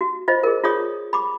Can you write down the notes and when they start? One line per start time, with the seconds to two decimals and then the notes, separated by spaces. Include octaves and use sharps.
0.01 F#4
0.28 F4 C5 D#5
0.43 G#4 A#4
0.64 F4 G#4 C#5 D5 D#6
1.13 B5 D6